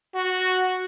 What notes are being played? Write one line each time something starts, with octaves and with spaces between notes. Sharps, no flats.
F#4